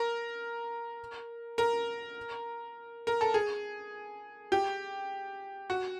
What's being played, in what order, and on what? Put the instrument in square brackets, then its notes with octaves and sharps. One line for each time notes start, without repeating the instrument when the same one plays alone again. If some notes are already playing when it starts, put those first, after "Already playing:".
Already playing: [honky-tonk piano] A#4
A#4
A#4
A4
G#4
G4
F#4